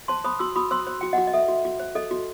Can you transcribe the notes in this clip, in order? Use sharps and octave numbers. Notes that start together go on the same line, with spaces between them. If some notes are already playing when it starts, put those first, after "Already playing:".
C5 A5 C6
C5 B5 D#6
F#4 C6 E6
F#4 B5 D#6
C5 C6 E6
C5
F#4 G5
D#5 F#5
F#4
D#5
A4 E5
F#4
F#4
C5
A4 D#5
F#4